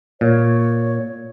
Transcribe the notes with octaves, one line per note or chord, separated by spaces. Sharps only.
A#2 C#5